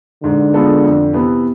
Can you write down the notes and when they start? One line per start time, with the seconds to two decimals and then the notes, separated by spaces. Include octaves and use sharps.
0.23 G#2 D3
0.53 G#3 B3 F4 A4
0.83 F2
1.13 C3 E3 B3